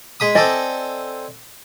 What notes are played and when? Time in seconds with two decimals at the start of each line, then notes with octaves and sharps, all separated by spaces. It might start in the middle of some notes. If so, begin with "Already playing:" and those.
0.20 G#3 B5 D#6
0.35 C4 A4 D5 D#5 G#5